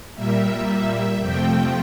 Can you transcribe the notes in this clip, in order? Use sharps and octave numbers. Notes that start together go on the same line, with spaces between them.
A#2 G3 A#3 E5
E5
F2 C3 F3 A3 C4 G5